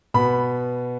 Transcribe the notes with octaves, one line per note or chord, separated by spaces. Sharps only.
B2 B3 B5